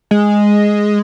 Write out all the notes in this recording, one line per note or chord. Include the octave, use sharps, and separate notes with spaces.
G#3